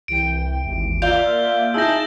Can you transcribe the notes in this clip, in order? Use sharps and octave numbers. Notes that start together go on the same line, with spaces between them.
C2 E3 G5 D7
G#1 D#2 E3
A#3 F4 D5 E5 F5 G6 G7
D#4 E4 G#4 A5 E6 G6 A#6